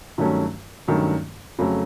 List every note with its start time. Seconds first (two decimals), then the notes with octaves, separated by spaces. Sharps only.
0.18 G2 D#3 F#3 A3 C#4
0.87 G2 D#3 F#3 A3 C#4
1.58 F2 C#3 F#3 A3